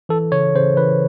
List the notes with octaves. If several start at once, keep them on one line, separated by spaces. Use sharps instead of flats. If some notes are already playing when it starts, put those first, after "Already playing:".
E3 A4
C#3 C#5
C#3 C5
E3 B4